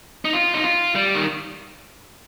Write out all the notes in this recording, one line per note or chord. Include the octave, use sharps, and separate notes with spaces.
D#4
F4
D#4
F4
G3
D#3